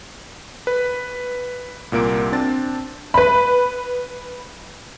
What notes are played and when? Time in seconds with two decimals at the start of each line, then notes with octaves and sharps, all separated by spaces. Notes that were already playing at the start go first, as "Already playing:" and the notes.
0.67 B4
1.92 C2 A#2 A#3 D7
2.32 C4 D4 A6
3.14 B4 B5